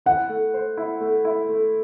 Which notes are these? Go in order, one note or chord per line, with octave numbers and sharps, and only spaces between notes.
E4 F#5
A3
C5
E4
A3
E4
A3